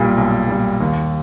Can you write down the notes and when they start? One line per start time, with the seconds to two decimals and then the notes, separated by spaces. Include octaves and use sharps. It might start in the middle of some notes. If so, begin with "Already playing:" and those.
Already playing: B1 A#2 G3
0.17 B1
0.49 A#2 G3
0.80 D#2